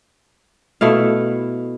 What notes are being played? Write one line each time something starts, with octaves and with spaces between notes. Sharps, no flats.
B2 A3 E4 F5